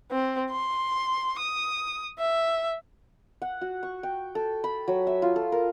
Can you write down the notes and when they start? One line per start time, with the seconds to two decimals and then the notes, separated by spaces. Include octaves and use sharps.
0.11 C4
0.52 C6
1.39 D#6
2.19 E5
3.42 F#5
3.61 F#4
3.83 C#6
4.03 G5
4.35 A4
4.64 B5
4.88 F#3
5.07 E5
5.22 F4
5.36 A4
5.52 A#4